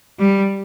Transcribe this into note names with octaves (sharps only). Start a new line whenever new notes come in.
G3